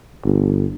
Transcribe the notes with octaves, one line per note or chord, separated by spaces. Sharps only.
G1